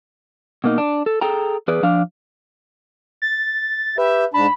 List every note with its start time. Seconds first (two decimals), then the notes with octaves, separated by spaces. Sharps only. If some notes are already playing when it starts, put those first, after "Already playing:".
0.64 B2 A#3 D#4
0.78 D4
1.06 A4
1.21 G#4 A4 G5 A#5
1.68 E2 G#4 B4 D5
1.83 F3 D4 F5
3.22 A6
3.98 G4 B4 E5
4.34 G#2 D4 A5 B5